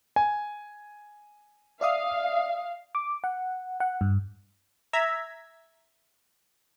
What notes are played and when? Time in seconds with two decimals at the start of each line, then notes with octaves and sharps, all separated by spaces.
0.16 G#5
1.81 D5 E5 F5 D#6
2.95 D6
3.24 F#5
3.80 F#5
4.01 G2
4.93 E5 A#5 E6 G#6 B6